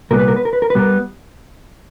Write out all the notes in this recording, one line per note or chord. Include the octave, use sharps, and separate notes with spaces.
C2 A#2 G3 B3 A#4
B4
A#4
B4
A#4
B4
A#4
B4
A#2 G3 B3 A#4